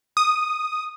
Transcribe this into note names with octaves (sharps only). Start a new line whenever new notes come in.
D#6